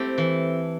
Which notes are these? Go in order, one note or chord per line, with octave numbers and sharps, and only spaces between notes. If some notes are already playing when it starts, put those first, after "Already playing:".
Already playing: A3 C4 E4 G4
E3